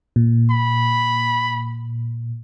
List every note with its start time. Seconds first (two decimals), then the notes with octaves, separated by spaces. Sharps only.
0.16 A#2
0.50 B5